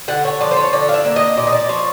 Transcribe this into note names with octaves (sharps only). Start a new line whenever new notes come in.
D3 F#5
C#5
F3 D5
C5
C#5
D3 D5
F5
E5
A#3
D#5
A#2 D5
D#5
D5
F3 C#5